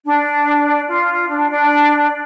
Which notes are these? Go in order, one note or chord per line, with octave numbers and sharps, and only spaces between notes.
D4
F4
D4
D4